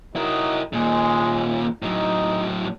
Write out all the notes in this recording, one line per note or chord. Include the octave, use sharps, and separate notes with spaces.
F#3 D#4 E4 A#4
D#2 A#2 G#3
A2 F#3 D#4